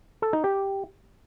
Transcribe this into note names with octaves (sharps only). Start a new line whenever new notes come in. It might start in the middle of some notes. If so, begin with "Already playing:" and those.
A4
D#4
G4